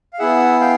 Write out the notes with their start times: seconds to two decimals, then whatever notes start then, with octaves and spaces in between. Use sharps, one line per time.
0.13 F5
0.19 B3 E4 G#4 E5 F#5
0.60 F5 G5